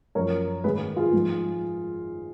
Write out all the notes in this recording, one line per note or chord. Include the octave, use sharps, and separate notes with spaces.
F#2 F3 A#4 C#5
G#2 D#3 G#4 B4
F4 G#4
G#2 F3